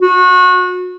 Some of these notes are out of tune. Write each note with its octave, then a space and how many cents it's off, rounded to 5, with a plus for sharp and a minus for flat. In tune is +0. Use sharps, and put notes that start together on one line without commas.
F#4 -30